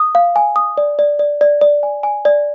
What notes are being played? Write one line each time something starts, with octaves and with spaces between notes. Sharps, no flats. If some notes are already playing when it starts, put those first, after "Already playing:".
Already playing: D#6
F5
G#5
D#6
D5
D5
D5
D5
D5
G#5
G#5
D5